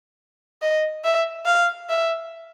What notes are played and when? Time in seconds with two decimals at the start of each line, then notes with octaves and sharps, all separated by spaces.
0.62 D#5
1.04 E5
1.46 F5
1.89 E5